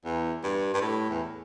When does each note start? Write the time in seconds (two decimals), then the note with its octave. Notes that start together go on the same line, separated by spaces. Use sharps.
0.05 E2
0.43 G2
0.74 G2
0.81 A2
1.10 E2